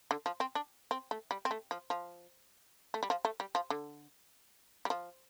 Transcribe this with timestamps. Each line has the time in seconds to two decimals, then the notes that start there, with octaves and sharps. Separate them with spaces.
0.11 D3
0.26 F3
0.40 C4
0.55 D4
0.91 C4
1.11 A3
1.31 G3
1.45 C4
1.51 A3
1.71 F3
1.90 F3
2.94 A3
3.03 G3
3.10 F3
3.25 A3
3.40 G3
3.55 F3
3.70 D3
4.85 G3
4.90 F3